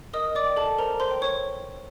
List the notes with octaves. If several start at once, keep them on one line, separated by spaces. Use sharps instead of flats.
A#4 D#5 D#6
D5 D6
G5
A4 A5
A#4 C5 A#5
C5 C6
G5
C#5 C#6